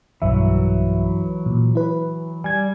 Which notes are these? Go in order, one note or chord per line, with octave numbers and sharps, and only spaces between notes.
B1 G2 E3 F#3 E5
A#2
E4 B4
G3 G#5 G#6